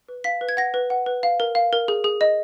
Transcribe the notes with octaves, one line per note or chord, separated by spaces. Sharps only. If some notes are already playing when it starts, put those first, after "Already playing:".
B4
F5 B6
B4
G#6
F#5 A#6
B4
F#5
B4
F5
A#4
F5
A#4
G#4
G#4
D#5